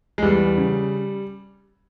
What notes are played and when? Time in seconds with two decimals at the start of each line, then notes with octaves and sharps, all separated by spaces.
0.18 G#3
0.22 E2 G3
0.58 C#3